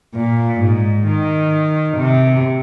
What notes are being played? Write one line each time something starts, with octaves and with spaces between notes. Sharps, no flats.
A#2
G#2
D#3
C3